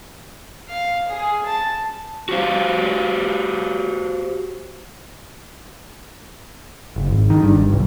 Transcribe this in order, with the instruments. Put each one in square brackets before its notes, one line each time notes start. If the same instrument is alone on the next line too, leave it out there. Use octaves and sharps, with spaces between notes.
[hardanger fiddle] F5
G#4
A5
[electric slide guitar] F#4 G4 C5 F5
[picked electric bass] F#1
G#1
D#3
G2
G1
B1